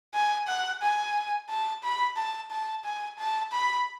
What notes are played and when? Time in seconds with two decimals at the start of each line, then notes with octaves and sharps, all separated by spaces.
0.14 G#5
0.48 F#5
0.82 G#5
1.49 A5
1.83 B5
2.17 A5
2.51 A5
2.84 G#5
3.19 A5
3.52 B5